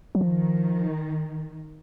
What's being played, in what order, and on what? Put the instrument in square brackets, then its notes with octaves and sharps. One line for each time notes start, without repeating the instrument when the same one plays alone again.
[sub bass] F#3
[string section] D#3 [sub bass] F3